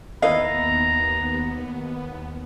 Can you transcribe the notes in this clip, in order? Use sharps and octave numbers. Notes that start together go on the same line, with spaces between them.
D#2 B3 E4 B4 D#5 F5 A#5